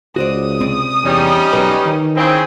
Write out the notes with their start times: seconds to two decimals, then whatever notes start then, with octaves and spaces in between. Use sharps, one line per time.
0.16 C#2 F#4 C5 D5 D#6
0.60 C3 C4 D5
1.03 E2 G3 C#4 D#4
1.53 B1 B4
1.86 D#3
2.16 C#3 C4 E4 G#4